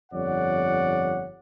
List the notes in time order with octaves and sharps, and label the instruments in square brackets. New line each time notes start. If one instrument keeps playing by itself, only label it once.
[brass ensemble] G1 F2 C#5 D5 F#5